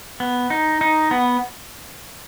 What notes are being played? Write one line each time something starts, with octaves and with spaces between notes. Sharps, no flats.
B3
D#4
D#4
B3